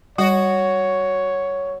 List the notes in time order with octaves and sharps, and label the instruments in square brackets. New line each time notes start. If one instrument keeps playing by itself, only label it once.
[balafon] G3 [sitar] F#4 [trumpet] C#5